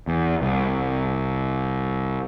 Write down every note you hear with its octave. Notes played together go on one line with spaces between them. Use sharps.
E2
C2